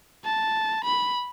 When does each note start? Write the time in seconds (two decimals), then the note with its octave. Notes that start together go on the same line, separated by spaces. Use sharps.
0.25 A5
0.84 B5